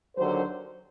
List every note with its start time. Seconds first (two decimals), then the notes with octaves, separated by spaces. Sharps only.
0.16 D#2 D3 F#3 C5